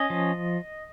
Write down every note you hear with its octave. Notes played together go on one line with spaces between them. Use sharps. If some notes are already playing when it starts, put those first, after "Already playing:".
Already playing: C#4 D#5
F3